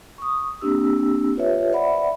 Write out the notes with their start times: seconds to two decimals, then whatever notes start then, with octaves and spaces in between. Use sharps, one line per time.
0.18 C#6 D#6
0.61 A#3 C4 D4 G4 E6
1.36 F4 G4 B4 C#5 E5
1.73 C5 D5 E5 F#5 B5